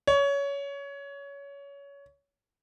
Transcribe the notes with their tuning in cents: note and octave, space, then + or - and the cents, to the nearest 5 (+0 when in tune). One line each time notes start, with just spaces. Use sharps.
C#5 +20